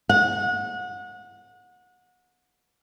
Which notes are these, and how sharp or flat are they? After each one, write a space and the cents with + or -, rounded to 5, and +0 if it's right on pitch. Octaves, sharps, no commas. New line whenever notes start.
F#5 -30